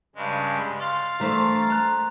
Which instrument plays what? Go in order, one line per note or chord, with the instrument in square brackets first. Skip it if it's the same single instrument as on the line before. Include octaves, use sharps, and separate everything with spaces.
[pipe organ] G2 C#3 G#3
[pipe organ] F5 A6 [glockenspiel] C6
[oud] E3 A3 D4 [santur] A#4 C5 B5
[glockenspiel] A#5 F#6